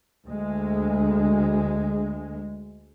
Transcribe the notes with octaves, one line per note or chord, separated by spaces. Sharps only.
D2 G#3